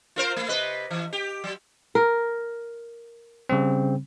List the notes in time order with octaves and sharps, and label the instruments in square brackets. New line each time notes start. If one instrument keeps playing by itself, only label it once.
[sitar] F4 A#4 C5
A3
C3 B4 D#5
E3
G4
F#3
[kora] A#4
[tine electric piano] C#3 G3 C4